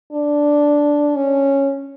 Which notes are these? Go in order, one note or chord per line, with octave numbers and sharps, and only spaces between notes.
D4
C#4